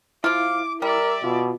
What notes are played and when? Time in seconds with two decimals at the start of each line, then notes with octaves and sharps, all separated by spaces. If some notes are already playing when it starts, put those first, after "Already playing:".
0.24 F3 E4 F4 D6
0.82 G3 A#4 D5 E5
1.24 B2 F4